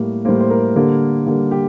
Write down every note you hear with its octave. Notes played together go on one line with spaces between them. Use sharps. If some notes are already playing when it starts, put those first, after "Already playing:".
Already playing: A2 G3 A#3
A2 G3 A#3 C5
C5
A#4
D3 G3 A#3
D3 G3 A#3
G4